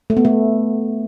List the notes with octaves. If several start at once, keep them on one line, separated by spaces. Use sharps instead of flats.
A3
B3
A3